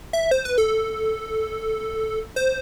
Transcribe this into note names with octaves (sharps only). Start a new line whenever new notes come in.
E5
C5
B4
A4
C5